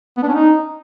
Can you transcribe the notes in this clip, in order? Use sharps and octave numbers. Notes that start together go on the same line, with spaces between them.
B3
D4
C#4
D#4